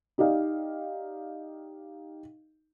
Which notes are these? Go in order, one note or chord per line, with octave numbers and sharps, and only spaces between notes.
D#4 G4 D5 D#5 F5